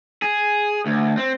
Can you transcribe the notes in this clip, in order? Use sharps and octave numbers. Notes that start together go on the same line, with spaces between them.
G#4
D2
C4